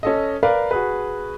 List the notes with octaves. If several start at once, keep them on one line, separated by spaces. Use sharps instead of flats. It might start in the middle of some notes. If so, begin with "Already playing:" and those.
C#4 A4 D#5
A#4 B4 D5 F5
F#4 G#4 B4